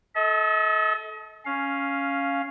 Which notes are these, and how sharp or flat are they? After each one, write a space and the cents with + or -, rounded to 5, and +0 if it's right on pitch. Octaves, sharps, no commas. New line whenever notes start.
A4 -20 D#5 +40
C#4 +0 F5 +0